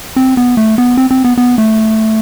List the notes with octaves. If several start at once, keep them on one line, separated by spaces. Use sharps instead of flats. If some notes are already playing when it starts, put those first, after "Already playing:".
C4
B3
A3
B3
C4
C4
B3
B3
A3